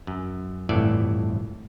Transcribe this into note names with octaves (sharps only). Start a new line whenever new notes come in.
F#2
G1 F2 A2 E3 D5 E5